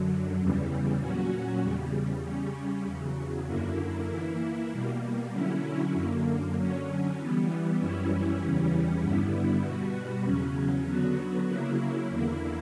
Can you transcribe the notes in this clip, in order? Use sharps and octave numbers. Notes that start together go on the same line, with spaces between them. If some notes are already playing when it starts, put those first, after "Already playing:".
Already playing: F#2 D3 F#3
E2 C#3 E3 G3
A#2 F#3 C#4 F#4
E2 C#3 G3
C#3 G3 C#4
E2 C#3 F#3
F#2 D3 A#3 E4
E3 A#3 E4
B2 G3 A#3
D3 F#3 C#4 E4
F#2 D3 A#3
D3 F#3 C#4
E3 G3 B3
F#2 E3 G3 C#4 E4
E2 C#3 E3 G3 C#4
G2 D3 G3 B3 E4
B2 G3 B3 F#4
E2 C#3 F#3 C#4
D3 F#3 B3 F#4
C#3 F#3 A#3 E4
E2 D3 A#3 E4